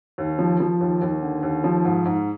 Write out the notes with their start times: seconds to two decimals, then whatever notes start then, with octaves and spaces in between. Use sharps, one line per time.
0.18 D#2
0.39 F3
0.60 F3
0.81 D#2
1.02 D#2
1.22 D3
1.43 D#2
1.64 F3
1.85 G#2
2.05 G#2